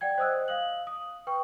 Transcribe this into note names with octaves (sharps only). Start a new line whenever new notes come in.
D5 F#5 G5 G#6
C5 D#5 D#6 E6 F#6
F5 D#6 F#7
D#6
B4 G5 C#6